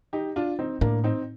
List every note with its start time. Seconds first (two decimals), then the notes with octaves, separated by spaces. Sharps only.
0.13 D#4 G4
0.36 D4 F4
0.59 C4 D#4
0.81 A2 A#3 D4
1.04 C4 D#4